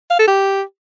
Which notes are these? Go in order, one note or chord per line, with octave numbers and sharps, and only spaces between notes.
F5
A4
G4